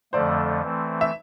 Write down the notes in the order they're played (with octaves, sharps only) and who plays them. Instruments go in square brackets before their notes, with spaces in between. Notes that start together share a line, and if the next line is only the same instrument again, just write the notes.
[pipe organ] F2 D3 F3 A3 [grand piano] C5 D5
[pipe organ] E3 A3 C4
[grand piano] E5